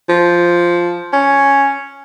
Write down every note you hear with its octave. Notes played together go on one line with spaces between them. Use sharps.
F3
C#4